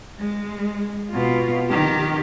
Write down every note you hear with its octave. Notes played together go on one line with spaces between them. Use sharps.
G#3
B2 F4
D#3 G4